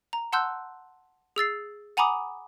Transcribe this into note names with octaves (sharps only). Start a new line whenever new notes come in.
A#5
F#5 A5 C6 E6 F#6 G6
G#4 E6 A6 C7
F#5 G#5 A#5 B5 D6 D#6